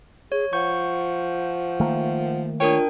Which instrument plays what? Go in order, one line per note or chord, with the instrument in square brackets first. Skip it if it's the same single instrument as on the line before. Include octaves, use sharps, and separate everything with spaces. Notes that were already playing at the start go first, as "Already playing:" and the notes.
[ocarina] G#4 [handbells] C#5
[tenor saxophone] F3 [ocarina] F#5 [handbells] C#6 G6
[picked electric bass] D#3 A3 A#3
[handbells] D4 A#4 G5 [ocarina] F4 [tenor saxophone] C#5